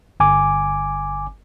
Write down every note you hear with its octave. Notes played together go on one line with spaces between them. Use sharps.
G1 G#5 D6